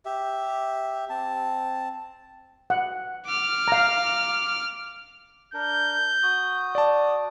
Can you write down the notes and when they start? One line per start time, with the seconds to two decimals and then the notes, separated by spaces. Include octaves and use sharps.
0.05 G4 E5
1.10 C4 A5
2.70 F#5
3.26 D6 F6
3.68 F5 A#5
5.54 D4 A#4 G6
6.23 F#4 D#6
6.75 D5 A5